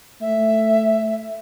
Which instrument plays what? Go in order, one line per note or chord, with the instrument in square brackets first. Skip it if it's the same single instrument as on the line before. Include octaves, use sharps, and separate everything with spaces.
[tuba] A3 [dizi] E5